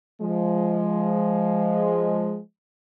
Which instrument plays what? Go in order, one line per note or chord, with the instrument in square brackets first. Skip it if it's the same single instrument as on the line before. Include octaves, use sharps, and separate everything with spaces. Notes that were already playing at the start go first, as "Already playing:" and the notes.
[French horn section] F3 G#3